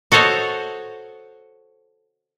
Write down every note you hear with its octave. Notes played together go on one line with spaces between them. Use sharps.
F#4 A4 C5 C#5 D#5